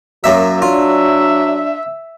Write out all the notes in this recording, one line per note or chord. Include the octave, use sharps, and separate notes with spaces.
F#2 F#3 A#3 E5
D4 F4 E5